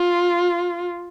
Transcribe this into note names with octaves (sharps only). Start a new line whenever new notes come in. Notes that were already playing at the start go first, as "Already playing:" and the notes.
Already playing: F4